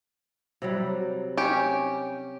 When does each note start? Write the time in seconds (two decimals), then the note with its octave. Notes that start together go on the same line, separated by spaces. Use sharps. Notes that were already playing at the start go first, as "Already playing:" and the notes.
0.62 C3 F#3 G3
1.37 C#4 G4 G#5